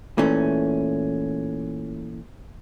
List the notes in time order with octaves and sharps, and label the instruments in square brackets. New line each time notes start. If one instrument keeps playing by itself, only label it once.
[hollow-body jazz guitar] A#2 E3 A3 C#4